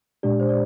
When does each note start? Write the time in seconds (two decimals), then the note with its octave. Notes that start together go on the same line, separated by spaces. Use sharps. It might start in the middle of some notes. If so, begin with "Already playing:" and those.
0.23 A#2 G#3 D4 G4 D5
0.40 C5
0.49 D5